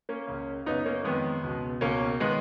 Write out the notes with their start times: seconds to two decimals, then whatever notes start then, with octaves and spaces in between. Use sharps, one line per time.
0.09 A#3 C#4
0.28 C#2 C#3
0.66 F#2 C#3 B3 D#4
0.86 A#3 C#4
1.04 F2 D#3 G#3 B3
1.43 C#2 B2
1.81 C#2 B2 A#3 C#4
2.20 D#3 G#3 B3